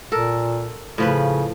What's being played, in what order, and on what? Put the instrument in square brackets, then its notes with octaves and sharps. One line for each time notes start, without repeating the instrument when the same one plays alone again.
[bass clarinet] A#2 [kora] A4 A#4
[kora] A2 F3 B4 [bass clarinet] C#3